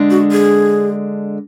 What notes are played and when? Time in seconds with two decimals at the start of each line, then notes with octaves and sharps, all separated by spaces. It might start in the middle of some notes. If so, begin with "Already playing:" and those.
Already playing: D3 G#3 D4
0.10 F#4
0.32 G#4